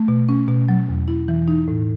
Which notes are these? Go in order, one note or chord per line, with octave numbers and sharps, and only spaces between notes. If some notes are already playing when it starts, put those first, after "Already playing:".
Already playing: A3
B2
C#4
B2
F#3
E2
E4
E3
D#4
A2